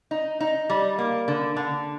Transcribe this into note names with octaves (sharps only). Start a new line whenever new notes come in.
D#4
D#4
G3
A#3
D3
D3